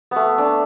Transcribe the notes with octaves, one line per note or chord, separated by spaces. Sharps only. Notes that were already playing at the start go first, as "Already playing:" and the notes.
A3 B3
D4